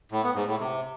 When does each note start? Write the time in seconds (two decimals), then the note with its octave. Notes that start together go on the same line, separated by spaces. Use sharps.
0.12 A2
0.24 B3
0.35 G#2
0.47 A2
0.59 C3